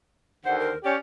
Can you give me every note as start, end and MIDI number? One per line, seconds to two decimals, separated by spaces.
0.44 0.71 39
0.44 0.71 50
0.44 0.71 72
0.44 0.58 78
0.59 0.78 70
0.83 0.95 61
0.83 0.95 67
0.83 0.97 74